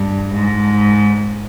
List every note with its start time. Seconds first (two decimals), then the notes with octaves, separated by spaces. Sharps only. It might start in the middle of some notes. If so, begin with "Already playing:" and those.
Already playing: G2
0.34 G#2